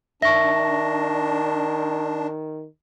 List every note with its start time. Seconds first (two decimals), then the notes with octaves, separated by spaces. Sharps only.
0.22 D#3 D4 E5 C#6 A#6